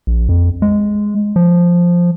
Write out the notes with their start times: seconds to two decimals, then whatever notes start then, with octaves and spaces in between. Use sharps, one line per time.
0.07 A#1
0.29 F2
0.62 G#3
1.36 F3